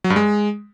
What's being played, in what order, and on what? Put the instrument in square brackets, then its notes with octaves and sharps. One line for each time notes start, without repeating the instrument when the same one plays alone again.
[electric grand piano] F#3
G2
G#3